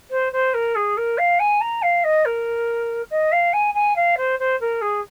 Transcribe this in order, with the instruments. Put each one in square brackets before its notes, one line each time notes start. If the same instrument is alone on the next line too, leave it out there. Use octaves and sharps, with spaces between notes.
[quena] C5
C5
A#4
G#4
A#4
F5
G#5
A#5
F5
D#5
A#4
D#5
F5
G#5
G#5
F5
C5
C5
A#4
G#4